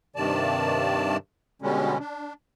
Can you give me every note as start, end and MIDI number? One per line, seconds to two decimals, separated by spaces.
0.16 1.17 43
0.16 1.17 48
0.16 1.17 51
0.16 1.17 74
0.16 1.17 81
1.62 1.98 47
1.62 1.98 50
1.62 1.98 55
1.62 1.98 56
1.62 1.98 61
2.00 2.33 62